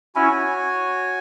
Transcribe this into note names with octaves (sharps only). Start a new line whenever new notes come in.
C#4 E4 F#4 C#5 G#5